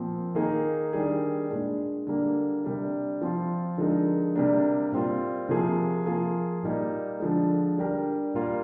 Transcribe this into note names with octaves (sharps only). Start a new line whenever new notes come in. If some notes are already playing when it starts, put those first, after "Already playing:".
Already playing: A#2 F3 C4
D#3 A#3 D#4 G#4
D#3 G3 D4 G#4
A#2 G#3 D4
D3 G3 A#3
C3 G3 D4
F3 C4 F4
D3 F3 G#3 D#4 A#4
C3 G3 A#3 D4
A#2 G3 C4 F4
C3 F3 A#3 F4 G#4
F3 A#3 F4 G#4
A#2 G3 A#3 D#4
D3 F3 G#3
G3 D4 G4 A#4
A#2 G3 A#3 F4